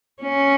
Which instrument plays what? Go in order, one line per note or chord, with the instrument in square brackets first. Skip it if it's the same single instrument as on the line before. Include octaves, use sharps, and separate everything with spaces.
[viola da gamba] C#4